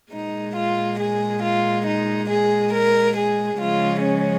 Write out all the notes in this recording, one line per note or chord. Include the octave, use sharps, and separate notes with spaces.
A#2 G#3 D#4
F4
G#4
F4
D#4
G#4
A#4
G#4
C#3 F3 G#3 F4
C#4